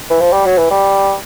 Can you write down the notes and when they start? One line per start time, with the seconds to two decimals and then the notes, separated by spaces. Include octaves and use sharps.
0.10 E3
0.20 F3
0.33 G3
0.46 F#3
0.58 E3
0.71 G3